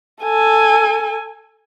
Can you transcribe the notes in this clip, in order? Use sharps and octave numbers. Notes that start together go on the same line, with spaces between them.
A4 G#5